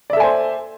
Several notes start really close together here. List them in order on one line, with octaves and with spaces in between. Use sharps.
D5 E5 A4 G#5 C5